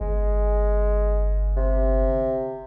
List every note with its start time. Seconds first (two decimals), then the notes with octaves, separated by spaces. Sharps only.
0.01 G1 G#3
1.57 C3